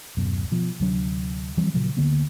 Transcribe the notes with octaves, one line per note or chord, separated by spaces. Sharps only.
D1 F#2 B2
B2 F3
D2 C3 F#3 D4
E3 F3 G3 C4
A#2 C#3 F3 F#3
D2 D3 A#3 B3